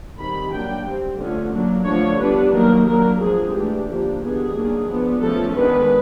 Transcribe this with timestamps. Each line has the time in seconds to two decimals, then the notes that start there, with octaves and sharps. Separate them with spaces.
0.19 D#3 G3 C4 B5
0.52 F#3 A#3 D4 G5
0.85 G3 C4
1.19 D3 F3 A3 C#4
1.53 F#3 A#3 D4
1.86 D3 F3 A3 D4 C#5
2.20 G3 B3 D4 B4
2.53 D#3 F#3 A#3 A#4
2.86 F#3 A#3 D4 A#4
3.20 D3 F3 G#3 C4 G#4
3.54 E3 A3 D4 G4
3.87 D3 F3 A#3 D4 G4
4.21 D#3 G3 B3 D4 G#4
4.55 D#3 F#3 A#3 D4
4.89 F3 G#3 B3 D4
5.21 F3 A3 C#4 A4
5.55 D#3 G#3 B3 D4 B4